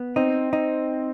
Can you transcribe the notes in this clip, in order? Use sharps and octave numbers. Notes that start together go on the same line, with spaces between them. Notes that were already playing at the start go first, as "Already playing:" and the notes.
Already playing: B3
C4 D#4
D#4